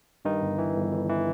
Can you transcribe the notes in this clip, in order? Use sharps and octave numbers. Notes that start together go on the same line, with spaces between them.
G2 D#3 D#4
G1
E3
G1
G1
E3